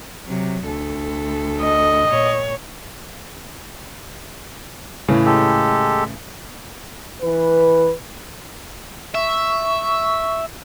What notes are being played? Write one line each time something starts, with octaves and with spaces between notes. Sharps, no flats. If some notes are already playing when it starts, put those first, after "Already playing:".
C3 F#3
D2 A4
D#5
A#2 C#5
A2 C#3 E3
G#3 G4 A4
E3 B4
E5 C#6